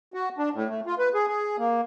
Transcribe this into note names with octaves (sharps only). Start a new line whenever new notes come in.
F#4
D4
A2
A3
F4
B4
G#4
G#4
A#3